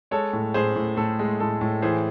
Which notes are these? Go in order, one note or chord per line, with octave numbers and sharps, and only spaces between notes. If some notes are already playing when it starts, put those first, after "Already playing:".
G#3 A4 C#5
A2
A2 G#4 C5
A2
A2 A4
G#3
A2 A4
A2
E3 G#4 C5